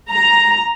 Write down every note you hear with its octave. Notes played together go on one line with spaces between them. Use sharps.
A#5